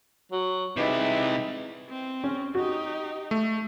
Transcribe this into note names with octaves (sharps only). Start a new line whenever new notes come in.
F#3
C3 E3 G3 G#3 D#4 E4
C4
C#4
D#4 F#4 G4
A3